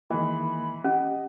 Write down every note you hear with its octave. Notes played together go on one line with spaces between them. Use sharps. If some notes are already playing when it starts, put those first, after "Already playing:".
D#3 E3 G#3 A#3 B5
C#4 G4 D#5